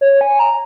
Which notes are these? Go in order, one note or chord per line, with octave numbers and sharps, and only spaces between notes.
C#5
G#5
A#5